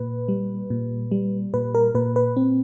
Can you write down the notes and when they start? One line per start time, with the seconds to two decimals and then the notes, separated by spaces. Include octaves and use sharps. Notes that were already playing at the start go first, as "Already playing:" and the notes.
Already playing: A#2 B4
0.28 G3
0.70 A#2
1.11 G3
1.54 A#2 B4
1.75 A#4
1.95 A#2 B4
2.16 B4
2.36 C4